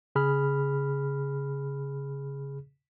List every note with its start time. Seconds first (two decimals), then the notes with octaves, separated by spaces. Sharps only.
0.15 C#3 G#4 B5 F6